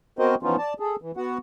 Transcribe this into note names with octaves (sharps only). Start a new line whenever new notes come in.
B3 C4 F#4 A#4 C5 D#5
E3 F3 B3 C#4 D#4 F4
D5 A5
G#4 A4
E3
B3 F#4 F#5